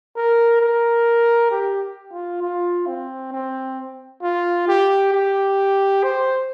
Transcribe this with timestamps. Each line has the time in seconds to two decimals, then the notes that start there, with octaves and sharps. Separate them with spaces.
0.16 A#4
0.61 A#4
1.51 G4
2.12 F4
2.42 F4
2.87 C4
3.32 C4
4.22 F4
4.68 G4
5.12 G4
6.03 C5